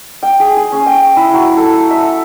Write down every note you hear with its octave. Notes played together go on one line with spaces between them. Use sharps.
G5
G#4
G#4
C#4
G5
E4
F#3
A4
E5